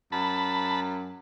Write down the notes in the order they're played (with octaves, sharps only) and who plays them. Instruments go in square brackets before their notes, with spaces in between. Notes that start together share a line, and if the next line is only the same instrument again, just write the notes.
[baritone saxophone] F#2 [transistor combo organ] A5 B5